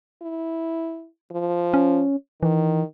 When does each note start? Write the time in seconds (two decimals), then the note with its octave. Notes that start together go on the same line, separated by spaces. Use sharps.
0.22 E4
1.31 F3
1.74 C#4
2.43 D#3 E3